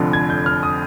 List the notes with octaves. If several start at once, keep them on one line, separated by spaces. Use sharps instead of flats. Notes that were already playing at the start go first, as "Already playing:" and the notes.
Already playing: F1 F2 D3 F3
G#6
G6
F6
D#6